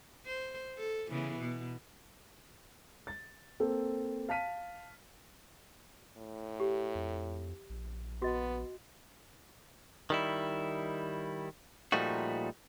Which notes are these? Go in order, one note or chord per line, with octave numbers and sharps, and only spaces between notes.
C5
A4
C#3 E3 B3
B2
A6
A#3 C4 A4
F5 A5 F6 B6 D#7
A2
G4
F2
A#1
B3 F#4 D#5
D#3 G3 E4
A#2 F3 G3 A3 D#4 F#4